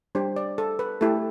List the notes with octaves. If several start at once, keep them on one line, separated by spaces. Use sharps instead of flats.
G3 D4 G4 C5
D5
A4
B4
A3 E4 G4 A4